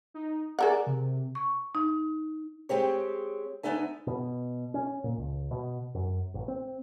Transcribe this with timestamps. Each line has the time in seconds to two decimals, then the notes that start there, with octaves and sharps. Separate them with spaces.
0.14 D#4
0.59 G#4 A#4 D5 F#5
0.87 C3
1.35 C#6
1.75 D#4
2.69 G#3 C4 G4 C#5
3.63 D2 F#3 B3 D#4 E5 G#5
4.07 B2
4.74 C#4
5.04 A#2
5.18 C#2
5.51 B2
5.94 F#2
6.34 A1
6.48 C4